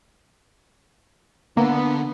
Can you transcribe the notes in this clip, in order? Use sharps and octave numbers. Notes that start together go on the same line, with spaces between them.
D3 A#3 B3